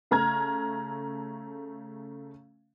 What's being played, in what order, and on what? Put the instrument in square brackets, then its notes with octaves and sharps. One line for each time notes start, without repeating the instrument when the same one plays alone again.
[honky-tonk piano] C#3 A3 A#5 F6 G#6